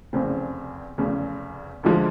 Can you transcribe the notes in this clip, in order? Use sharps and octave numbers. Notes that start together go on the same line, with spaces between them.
F1 E2 C#3 C4
F1 E2 C#3
D2 D3 F3 G#3